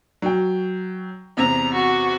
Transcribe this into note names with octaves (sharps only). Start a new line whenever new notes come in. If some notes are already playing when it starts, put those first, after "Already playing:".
F#3 G5
E2 C3 A#5
F#4